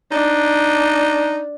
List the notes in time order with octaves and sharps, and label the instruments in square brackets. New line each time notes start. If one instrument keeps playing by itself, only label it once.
[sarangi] D4 [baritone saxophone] D#4